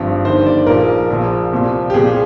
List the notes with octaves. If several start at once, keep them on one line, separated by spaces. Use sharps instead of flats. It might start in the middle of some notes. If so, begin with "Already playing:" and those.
Already playing: G#1 G2 F3
G1 G2 D#3 C5
D5
A#1 A#2 F3 A#4
A#1 A#2 F3
C2 A#2 F3
G4
C2 A#2 F3 G#4